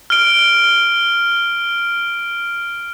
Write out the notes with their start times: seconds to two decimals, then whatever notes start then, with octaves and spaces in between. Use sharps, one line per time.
0.10 F6 D7